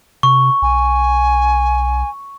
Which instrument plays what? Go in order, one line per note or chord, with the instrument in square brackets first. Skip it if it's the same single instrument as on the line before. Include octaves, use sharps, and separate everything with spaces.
[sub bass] C3 [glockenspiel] C#6
[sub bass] B1 [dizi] G#5